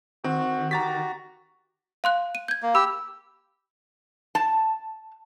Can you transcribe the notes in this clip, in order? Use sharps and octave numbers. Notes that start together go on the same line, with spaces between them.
D#3 C4 F#4
F#4 G4 A#5 A6 B6
F5 C6 F#6
D#7
G6 G#6
A#3
G4 B5 E6
A5